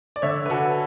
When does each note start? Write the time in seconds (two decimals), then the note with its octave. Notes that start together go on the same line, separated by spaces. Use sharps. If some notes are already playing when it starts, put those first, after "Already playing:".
0.16 D5
0.22 D3 C#5 E5
0.46 B4
0.50 F#4 A4